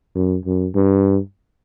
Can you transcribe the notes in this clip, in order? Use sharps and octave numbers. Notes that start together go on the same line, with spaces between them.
F#2
F#2
G2